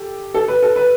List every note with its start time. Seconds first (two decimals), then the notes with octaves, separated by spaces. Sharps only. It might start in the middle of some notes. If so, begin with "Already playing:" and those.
Already playing: G4 A4
0.34 A4
0.48 B4
0.63 A4
0.76 B4